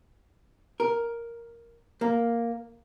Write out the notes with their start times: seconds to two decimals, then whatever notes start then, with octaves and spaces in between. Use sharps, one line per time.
0.80 A#4
2.01 A#3